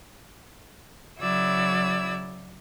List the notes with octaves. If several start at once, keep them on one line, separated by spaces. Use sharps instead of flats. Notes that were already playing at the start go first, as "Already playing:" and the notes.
C#3 F#3 E4 D5 E6 G#6